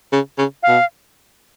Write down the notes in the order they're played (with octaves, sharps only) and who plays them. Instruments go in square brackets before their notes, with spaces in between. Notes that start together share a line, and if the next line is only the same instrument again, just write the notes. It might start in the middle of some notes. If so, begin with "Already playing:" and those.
[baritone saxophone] C#3
C#3
[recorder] F5
[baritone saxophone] B2